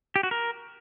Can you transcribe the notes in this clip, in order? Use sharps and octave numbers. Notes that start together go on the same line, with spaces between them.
G4
F#4
A#4